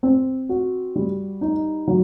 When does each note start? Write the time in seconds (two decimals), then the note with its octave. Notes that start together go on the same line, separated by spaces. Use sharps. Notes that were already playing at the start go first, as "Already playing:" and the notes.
0.03 C4
0.49 F#4
0.96 G3
1.41 D#4
1.87 F#3